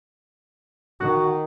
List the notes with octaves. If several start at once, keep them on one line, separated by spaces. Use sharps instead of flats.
D#3 F#4